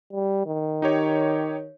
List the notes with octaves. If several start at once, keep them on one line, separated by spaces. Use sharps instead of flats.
G3
D#3
D#4 G4 C#5